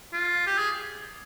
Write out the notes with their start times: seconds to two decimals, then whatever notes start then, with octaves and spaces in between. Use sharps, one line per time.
0.13 F4
0.47 G4
0.58 G#4